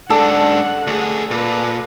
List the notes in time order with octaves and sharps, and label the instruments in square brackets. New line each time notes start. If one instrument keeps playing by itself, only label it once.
[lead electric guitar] G#2 D4 [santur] A4 [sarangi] F#5
[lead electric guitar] D2 G#4
[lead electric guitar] A#2 [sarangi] B4